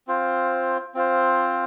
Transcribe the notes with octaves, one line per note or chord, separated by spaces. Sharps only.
C4 F4 C5
C4 F4 C5